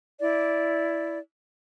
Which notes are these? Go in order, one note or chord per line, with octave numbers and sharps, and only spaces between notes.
E4 D5